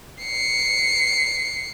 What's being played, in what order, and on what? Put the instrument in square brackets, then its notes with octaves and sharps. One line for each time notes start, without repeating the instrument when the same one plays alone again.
[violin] C7 C#7